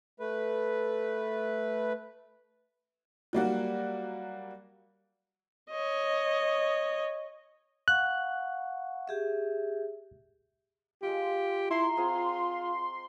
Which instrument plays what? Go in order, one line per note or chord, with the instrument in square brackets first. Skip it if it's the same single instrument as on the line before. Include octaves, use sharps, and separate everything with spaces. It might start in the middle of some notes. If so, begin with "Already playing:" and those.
[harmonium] A3 B4
[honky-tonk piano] F#3 G3 A#3 F#4
[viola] C#5 D#5
[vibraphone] F5 F#5 C#6 [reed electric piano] F#6
[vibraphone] G4 G#4 E5
[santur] G#3 F4 [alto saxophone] G4
[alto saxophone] E4 [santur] A#5 [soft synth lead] C6
[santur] C4 G#4 [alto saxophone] F4